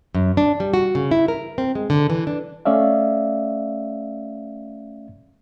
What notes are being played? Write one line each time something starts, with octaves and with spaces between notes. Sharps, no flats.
F#2
D4
G3
F#4
C#3
E4
A#4
C4
G#3
D3
E3
D4
A3 C#4 D5 E5 F5